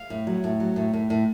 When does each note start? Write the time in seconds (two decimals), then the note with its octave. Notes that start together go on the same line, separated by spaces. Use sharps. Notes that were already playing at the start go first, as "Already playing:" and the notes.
Already playing: F5
0.10 A2
0.27 F#3
0.44 A2
0.60 F#3
0.76 A2
0.93 A2
1.10 A2